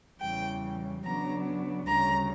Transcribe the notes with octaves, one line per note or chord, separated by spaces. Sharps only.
E2 C#3 E3 G3 G5
C#3 F#3 B3 D4 A#5
D2 C#3 G3 A#5